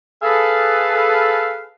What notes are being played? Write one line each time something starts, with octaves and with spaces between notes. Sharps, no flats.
G#4 A4 B4 F5